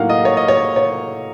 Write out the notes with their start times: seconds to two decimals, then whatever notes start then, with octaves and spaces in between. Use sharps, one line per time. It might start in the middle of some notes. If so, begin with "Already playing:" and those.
Already playing: A2 F#3 A#3 D#4 F5 F#5
0.09 D#5
0.25 C#5
0.37 D#5
0.48 C#5
0.76 C#5